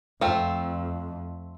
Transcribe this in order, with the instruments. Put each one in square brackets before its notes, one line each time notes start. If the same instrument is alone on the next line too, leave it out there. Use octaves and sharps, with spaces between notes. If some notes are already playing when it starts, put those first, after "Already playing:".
[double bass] F2 [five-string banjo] A3 C4 F4